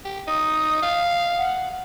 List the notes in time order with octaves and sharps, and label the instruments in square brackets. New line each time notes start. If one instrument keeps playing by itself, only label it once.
[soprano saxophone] G4
[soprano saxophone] D#4 [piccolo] D#6
[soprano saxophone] F5
[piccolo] F#5